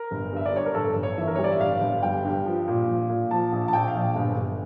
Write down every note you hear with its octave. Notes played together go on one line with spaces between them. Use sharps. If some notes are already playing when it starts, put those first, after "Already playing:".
Already playing: A#4
G1
G2 E5
D5
G2 C#5
A#4
G1 A4
G1
C#5
E3 E5
A#4
G3 C#5
D5
E5
G1 F5
G1
G3 G5
G2
F3
A#2
F3
A#2
F3 A5
A#1
A5
A#1 G5
F5
A#1
G1
G1